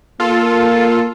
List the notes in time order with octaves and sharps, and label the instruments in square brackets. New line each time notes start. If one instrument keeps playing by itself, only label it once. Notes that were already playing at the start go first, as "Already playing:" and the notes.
[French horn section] A#3 [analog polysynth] F4 A4